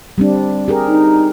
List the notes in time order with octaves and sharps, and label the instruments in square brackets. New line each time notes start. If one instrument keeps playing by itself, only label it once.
[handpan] G3 C4 D4
G4 G#4 A#4
[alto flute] D#4